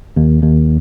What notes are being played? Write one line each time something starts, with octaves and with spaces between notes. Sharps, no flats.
D#2
D#2